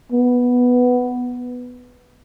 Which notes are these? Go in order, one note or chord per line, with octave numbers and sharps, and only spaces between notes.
B3